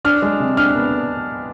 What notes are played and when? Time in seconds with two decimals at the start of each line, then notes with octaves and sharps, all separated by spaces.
0.05 D4 F6
0.22 G#3
0.40 C3
0.57 D4 F6
0.75 B3